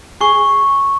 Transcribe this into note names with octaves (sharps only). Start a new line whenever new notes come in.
G#4 C#6